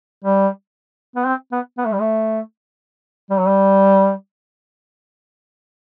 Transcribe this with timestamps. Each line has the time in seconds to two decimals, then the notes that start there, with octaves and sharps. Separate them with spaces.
0.24 G3
1.16 B3
1.26 C4
1.52 B3
1.78 B3
1.85 A3
1.92 G3
2.00 A3
3.30 G3
3.39 F#3
3.48 G3